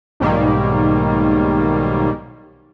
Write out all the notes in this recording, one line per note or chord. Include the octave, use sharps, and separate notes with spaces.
B1 G#2 D#3 G3 A#3